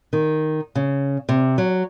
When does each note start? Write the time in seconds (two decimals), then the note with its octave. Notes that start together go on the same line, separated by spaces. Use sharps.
0.13 D#3
0.75 C#3
1.29 C3
1.58 F#3